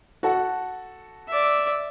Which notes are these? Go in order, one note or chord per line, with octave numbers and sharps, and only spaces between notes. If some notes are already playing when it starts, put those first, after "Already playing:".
F#4 A4 F#5
D5 E5